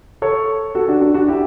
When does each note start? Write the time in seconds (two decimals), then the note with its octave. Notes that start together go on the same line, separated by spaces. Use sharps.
0.22 A4 C#5
0.75 F#4 A4
0.88 D4 F#4
1.01 D4 F#4
1.14 D4 F#4
1.28 E4 G4